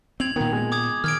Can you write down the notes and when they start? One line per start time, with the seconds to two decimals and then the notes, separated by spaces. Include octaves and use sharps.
0.20 C4 G#6 F7 F#7
0.36 A#2 D#3 B3
0.52 G#3
0.72 D6 D#6 G#6
1.04 D#3 F6 G#6 D7